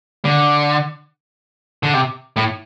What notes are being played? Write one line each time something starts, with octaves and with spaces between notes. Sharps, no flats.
D3
D3
C3
A2